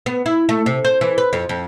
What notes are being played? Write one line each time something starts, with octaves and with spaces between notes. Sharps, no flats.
B3
E4
A3
C3
C5
E3
B4
F2
F2